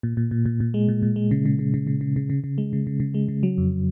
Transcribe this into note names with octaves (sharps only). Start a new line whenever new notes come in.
A#2
A#2
A#2
A#2
A#2
G#3
A#2
A#2
G#3
C#3
C#3
C#3
C#3
C#3
C#3
C#3
C#3
C#3
G#3
C#3
C#3
C#3
G#3
C#3
F#3
F2